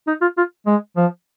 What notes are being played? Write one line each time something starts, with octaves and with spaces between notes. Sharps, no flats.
D#4
F4
F4
G#3
F3